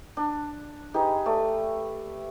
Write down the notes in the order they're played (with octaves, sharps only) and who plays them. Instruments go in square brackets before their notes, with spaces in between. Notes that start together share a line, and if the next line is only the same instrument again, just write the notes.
[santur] D4
D#4 G4 G#4 B4
A3 D5